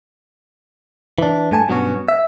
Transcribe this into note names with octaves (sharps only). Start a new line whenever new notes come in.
E3 D4
G2 A3 G#5 A5
G2 B2 F#3 B3 C#4 F#4
E5